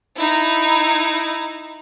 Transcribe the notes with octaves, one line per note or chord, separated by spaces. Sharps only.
D#4 E4